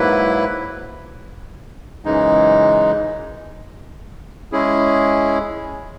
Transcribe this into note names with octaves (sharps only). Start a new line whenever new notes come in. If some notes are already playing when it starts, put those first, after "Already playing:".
Already playing: G#2 F#3 A#3 E4 B4
F#2 C#3 E3 G#3 D#4
G#3 C#4 E4 G#4